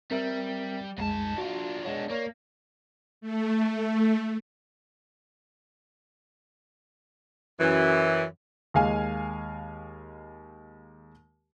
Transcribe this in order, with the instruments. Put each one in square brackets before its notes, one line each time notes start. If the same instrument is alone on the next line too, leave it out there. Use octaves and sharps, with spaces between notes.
[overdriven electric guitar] G3 [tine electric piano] C4 A#4 E5
[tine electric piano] B1 F2 G#3 [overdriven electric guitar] G#2 A5
[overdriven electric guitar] D4 F4 [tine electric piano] F#4
[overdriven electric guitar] G#3 D4 [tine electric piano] C#5 F#5
[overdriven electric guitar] A#3 [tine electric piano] C#5 D5
[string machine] A3
[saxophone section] F#2 E3
[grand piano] D#2 G#3 F5 G#5